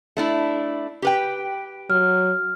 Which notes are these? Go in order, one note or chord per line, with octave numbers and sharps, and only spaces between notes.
A3 D4 E4
G4 B4 G5
F#3 F6